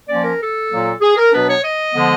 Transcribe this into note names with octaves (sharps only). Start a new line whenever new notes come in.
F3 A#3 C#4 D5
A#4
A4
A#2 F#3 A#3
G#4
A#4
B2 F#3 B3 D4 B4
C#5
D#5
D3 F3 G#3 B3